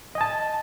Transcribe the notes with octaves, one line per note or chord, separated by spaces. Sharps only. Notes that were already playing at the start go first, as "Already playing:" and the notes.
D#5 G#5 A5